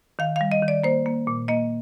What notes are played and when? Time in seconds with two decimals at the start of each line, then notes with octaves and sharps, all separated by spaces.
0.19 D#3 F5
0.36 G3 F5
0.52 D#5
0.62 D#3
0.68 D5
0.83 A#3 C5
1.06 A#3
1.27 A#2
1.48 A#3 D#5